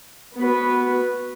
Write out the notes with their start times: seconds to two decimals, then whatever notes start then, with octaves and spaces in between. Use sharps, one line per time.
0.35 B3 F#4 B4